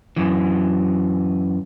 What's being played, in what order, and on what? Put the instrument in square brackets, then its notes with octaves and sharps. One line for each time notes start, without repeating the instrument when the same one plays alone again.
[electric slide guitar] F#2 E3